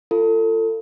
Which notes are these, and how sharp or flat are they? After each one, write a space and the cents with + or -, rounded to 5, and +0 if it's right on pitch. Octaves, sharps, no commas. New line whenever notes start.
F4 -20 A4 +30